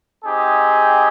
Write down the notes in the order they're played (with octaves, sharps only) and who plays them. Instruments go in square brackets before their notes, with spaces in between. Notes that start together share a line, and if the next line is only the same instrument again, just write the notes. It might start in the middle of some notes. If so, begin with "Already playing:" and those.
[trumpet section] C4 D#4 G4 G#4